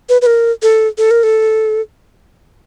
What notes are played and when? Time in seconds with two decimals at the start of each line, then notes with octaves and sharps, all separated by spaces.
0.09 B4
0.22 B4
0.26 A#4
0.62 A4
0.98 A4
1.11 A#4
1.23 A4